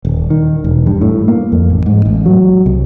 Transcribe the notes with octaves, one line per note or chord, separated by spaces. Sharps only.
D#1
D#3
E1
G2
A2
A#3
F2
A1
G#2
A1
F#3
C2